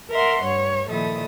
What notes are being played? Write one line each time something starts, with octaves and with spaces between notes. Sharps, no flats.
A#4 E5 F#5 C6
G2 C#5
A#2 D#3 F3 E4 A4 D#6